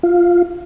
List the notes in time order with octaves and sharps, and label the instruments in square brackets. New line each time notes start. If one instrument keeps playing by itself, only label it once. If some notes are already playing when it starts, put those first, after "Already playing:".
[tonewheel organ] F4